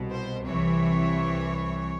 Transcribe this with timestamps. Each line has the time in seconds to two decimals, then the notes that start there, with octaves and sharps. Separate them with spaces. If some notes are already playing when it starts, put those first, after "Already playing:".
Already playing: C2 B2
0.12 C5
0.47 C2 C3 E3 C#5